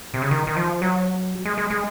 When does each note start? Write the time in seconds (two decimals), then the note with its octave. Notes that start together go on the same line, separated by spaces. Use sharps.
0.14 C3
0.22 C#3
0.31 D#3
0.47 D#3
0.57 F3
0.82 F#3
1.45 G#3
1.58 G#3
1.70 G#3